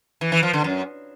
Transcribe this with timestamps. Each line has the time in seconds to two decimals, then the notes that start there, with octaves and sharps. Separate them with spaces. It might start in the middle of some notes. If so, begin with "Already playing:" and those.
0.21 E3
0.32 E3
0.43 F3
0.53 D3
0.64 F#2